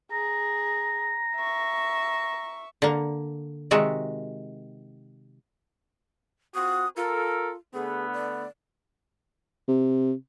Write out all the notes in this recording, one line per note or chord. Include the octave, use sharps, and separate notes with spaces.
G#4 A#5
E5 C#6
D3 A#3
C3 D#3 G#3 F#4 E5
C4 F4 F#4 D#6
F4 A4 A#4
D3 A3 B3 G#4
D5
C3